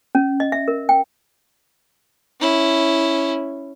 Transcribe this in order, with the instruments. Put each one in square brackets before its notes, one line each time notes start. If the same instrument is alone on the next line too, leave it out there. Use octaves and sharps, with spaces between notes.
[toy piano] C#4
D#5
E5
A#4
G5
[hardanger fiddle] C#4 E4